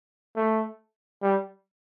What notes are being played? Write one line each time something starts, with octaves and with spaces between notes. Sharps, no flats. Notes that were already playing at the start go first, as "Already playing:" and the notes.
A3
G3